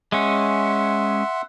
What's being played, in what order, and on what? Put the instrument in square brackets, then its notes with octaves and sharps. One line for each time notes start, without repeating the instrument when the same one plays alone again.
[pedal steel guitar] G#3 C#4 [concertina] E5 F#5 C6